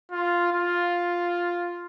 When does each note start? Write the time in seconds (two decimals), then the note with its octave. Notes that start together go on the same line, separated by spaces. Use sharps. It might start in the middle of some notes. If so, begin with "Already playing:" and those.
0.12 F4
0.52 F4